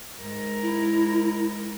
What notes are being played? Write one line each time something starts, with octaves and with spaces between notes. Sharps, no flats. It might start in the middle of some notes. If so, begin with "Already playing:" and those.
G#2 A#4
E4